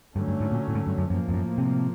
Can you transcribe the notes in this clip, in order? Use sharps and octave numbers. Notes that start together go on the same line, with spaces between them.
G2 D3 F#3 A3 C#4
G2
G#2
A#2
A2
G#2
G2
F#2
F#2 A2 F3 A#3
F2
F#2
C3